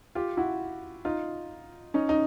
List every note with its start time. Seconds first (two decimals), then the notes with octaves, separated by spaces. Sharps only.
0.15 F4 G4
0.37 E4 F#4
1.05 D#4 F4
1.94 C#4 D#4
2.09 D#4